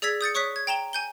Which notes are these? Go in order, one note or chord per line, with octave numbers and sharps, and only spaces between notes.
G#4 D5 E6 G#6 B6
D#6 G6 A6 C#7
C#5 C#6 D#6 F#6 B6
G#6
G5 A#5 E7 G7
G#5 G6 G7